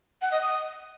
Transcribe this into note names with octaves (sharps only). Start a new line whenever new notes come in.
F#5
D#5
D#6